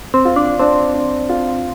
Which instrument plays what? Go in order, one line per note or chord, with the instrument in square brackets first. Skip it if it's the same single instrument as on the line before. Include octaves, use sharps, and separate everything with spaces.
[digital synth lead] C4
[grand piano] F4
[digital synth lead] D4
[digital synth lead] C4 [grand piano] D4
[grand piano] D4
F4